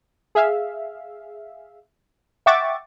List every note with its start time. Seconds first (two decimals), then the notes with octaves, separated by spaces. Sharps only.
0.35 G#4 E5 F5
2.46 E5 F#5 G5 C#6 D6 A6